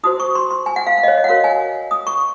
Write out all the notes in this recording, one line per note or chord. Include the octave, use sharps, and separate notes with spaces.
D#4 F#4 C5 D#6
C#6
C6
C6
G#5
F#5
F5
F5
D#5
C#5
D#5
F#5
F#4 A#4 C#5 F5
G#5
D#6
C#6